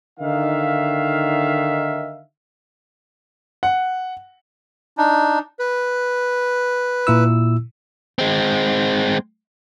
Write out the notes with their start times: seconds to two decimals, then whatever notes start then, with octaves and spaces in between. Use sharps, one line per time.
0.20 D3 D#3 D#4 E5 F5
3.63 F#5
4.98 D4 D#4
5.59 B4
7.07 A#2 E4 E6
8.19 G#3 C4